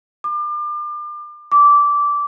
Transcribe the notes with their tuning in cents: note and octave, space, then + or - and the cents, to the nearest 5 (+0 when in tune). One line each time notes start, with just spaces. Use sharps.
D6 +35
D6 -15